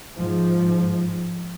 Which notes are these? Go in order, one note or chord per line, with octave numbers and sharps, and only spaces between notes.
G#2 F3